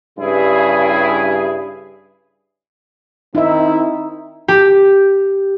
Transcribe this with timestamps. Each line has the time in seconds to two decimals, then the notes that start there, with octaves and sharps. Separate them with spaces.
0.19 G2 C#3 E4 G#4
3.35 D#3 C4 D#4 E4 E5
4.48 G4